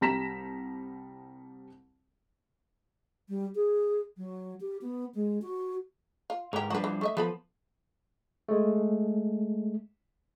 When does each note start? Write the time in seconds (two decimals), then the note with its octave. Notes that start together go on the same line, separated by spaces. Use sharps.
0.01 C2 G3 A#5 A#6 B6 E7
3.29 G3
3.55 G#4
4.17 F#3
4.61 G4
4.82 B3
5.15 G#3
5.42 F#4
6.30 F4
6.53 G#2 E3 G4 A#4
6.70 F3 G3 D4 F#4 B4
6.84 E3
7.01 A3 D#5 E5
7.17 F3 B3 A4 B5
8.49 G#3 A3